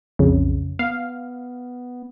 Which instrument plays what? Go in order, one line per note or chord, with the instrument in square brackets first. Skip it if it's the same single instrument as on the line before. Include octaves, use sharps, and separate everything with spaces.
[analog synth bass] B1 [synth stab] F2 C#3
[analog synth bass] B3 [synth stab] F5